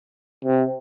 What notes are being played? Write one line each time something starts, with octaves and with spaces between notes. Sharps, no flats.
C3